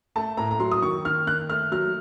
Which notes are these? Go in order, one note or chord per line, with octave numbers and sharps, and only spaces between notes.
A3 A5
A2 A#5
A#5
F#3 C6
D#6
D#3 C#6
D#3 F6
D#3 F#6
A3 F6
F#3 F6